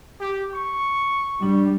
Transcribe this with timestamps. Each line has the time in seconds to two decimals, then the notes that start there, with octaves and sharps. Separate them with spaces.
0.20 G4
0.54 C#6
1.43 G3 D4